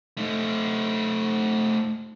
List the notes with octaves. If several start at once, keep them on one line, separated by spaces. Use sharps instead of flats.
A3 D#4